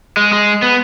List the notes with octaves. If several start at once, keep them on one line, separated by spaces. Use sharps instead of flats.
G#3
G#3
B3